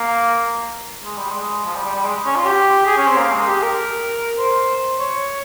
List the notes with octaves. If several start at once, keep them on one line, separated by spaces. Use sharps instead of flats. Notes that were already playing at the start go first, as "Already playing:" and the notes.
Already playing: A#3
G#3
G3
G#3
F3
G3
G3
G3
G#3
C#4
F4
G4
G#4
C#4
C4
A#3
G#3
G4
A#4
C5
C#5